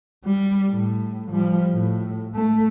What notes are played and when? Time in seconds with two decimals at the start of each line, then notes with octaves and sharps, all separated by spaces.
0.25 G3
0.70 A2
1.32 F3 G3
1.73 A2
2.35 A3